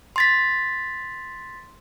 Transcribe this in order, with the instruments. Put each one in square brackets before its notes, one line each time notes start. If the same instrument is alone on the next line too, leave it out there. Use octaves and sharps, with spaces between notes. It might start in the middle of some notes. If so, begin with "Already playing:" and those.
[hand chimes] C6 A6 B6